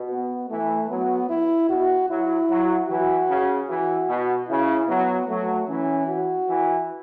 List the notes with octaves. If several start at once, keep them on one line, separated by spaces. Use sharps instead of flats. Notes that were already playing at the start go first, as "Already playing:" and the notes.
Already playing: B2
B3
E3 A3
F#3 B3
E4
B2 F#4
F#3 E4
F#3
E3 F#4
C#3
E3 F#4
B2
C#3 E4
F#3 B3
F#3 A3
E3 C#4
F#4
E3